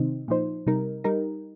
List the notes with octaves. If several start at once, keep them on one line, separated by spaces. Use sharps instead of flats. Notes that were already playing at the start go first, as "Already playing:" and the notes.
Already playing: C3 D#3 C4 D#4
A#2 F3 D#4 C5
C3 G3 D#4 A#4
G3 D#4 A#4